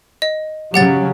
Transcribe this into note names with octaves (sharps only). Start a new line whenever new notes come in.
D#5
C#3 F#3 G4 F#5 A6